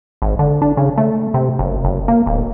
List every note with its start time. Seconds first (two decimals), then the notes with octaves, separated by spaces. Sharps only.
0.22 G#1
0.39 D3
0.62 D4
0.77 C#3
0.98 A3
1.34 C3
1.59 F#1
1.85 F#1
2.08 A#3
2.26 D1